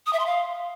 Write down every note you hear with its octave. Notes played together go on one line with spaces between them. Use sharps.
D#6
E5
C6
F5